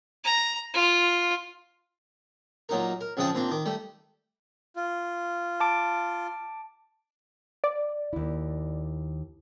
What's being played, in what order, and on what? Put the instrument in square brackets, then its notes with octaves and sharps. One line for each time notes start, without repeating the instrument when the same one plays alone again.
[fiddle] A#5
F4
[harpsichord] A#2 F#3 D#4 A#4
A#4
F2 C#3 F3 G#4 G5 A5
A#2 C4 D4
D#3 D6
G3 A3
[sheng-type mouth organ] F4
[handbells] A5 D6 D7
[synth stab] D5
[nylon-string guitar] D#2 E4